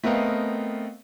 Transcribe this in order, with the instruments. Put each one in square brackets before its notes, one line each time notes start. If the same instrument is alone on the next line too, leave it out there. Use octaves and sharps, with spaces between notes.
[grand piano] A3 B3 C4 A#4 D#5 F5